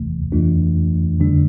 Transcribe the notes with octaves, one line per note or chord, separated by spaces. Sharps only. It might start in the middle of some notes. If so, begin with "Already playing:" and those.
Already playing: G1 F2 C3 E3 A3
F2 E3 A3 D4 F4
F2 D3 G3 D4